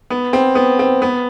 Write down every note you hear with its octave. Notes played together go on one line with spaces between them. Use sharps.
B3
C4
B3
C4
B3